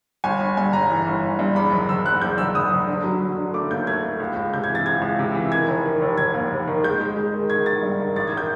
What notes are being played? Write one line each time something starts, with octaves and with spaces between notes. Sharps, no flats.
G1 G#5
G1
G2 G#5
G1 A#5
E3
G1
G1
G2
E2 B5
F#1
F#1 E6
F#1 F#6
E2 G6
F#1 E6
F#1 D#6
F#1
D3
F#3
F#3
D3
A3 D6
D#2 G6
A3 G#6
A3
C#2
C#2
C3 G6
G#6
E3 A6
C#2 G#6
C#2
C3
E3
D#3 G#6
F1
D#3
F1
F1 G#6
D#2
F1
D#3
G#3 G6
G#3
G#3
D#3
D#3 G#6
D#3 A6
G2
D#3
A1 A6
G#6
D#3 G6